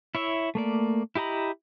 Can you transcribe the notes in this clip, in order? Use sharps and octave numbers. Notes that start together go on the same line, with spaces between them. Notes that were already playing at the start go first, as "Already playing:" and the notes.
E4 C#5 E5
A3 A#3 D5
E4 G4 D#5 A#5 B5